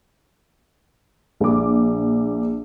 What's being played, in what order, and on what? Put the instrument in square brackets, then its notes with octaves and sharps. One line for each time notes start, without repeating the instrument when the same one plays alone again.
[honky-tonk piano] A#1 D6